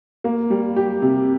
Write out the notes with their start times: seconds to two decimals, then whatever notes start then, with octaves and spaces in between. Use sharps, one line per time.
0.24 A#3
0.50 G3
0.76 G4
1.02 C3